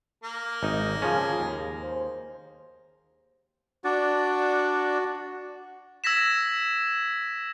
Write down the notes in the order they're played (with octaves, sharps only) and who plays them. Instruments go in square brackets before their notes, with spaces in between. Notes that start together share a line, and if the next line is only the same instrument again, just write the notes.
[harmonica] A#3 A#4
[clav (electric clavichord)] G#1 D#4
[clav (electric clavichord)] C#3 F3 C#4 [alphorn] G#4
[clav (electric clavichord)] D#2
[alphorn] C5
[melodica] D4 D5 [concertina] F#4
[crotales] E6 G#6 A#6 B6 E7